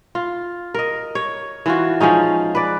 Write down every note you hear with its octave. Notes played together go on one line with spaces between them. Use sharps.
F4
A#4 D#5
C#5
E3 F4 F#4
F3 G#3 C#4 D#4
B4 D5